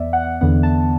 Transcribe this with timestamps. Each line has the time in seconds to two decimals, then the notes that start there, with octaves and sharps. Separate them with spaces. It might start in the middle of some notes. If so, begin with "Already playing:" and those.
Already playing: E2 B3 D5 E5
0.13 F#5
0.41 E2 D3 B3 F#5
0.63 A5